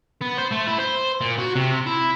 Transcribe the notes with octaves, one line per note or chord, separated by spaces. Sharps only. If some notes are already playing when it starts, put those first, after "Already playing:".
B3
C5
A3
E4
C5
A#2
F#4
C3
E4